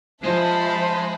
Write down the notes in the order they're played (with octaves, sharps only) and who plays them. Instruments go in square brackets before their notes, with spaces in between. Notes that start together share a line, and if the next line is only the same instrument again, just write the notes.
[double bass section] F3 [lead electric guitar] G#3 D#5 [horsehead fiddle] C5 [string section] E5 A5 B5